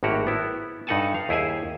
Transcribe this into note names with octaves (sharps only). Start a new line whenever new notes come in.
G#1 A2 A#3 F#4 G4 C#5
B3 E4
G2 D#4 A4 F#5 G#5 A5
F5
D#2 E4 G#4 C5 G#5